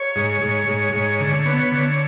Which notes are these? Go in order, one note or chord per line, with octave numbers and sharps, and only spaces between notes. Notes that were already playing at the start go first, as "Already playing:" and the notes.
Already playing: C#5
G#2
G#2
G#2
G#2
D3
B3
D3